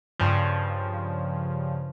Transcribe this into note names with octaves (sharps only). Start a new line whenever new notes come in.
G2 C#3 F3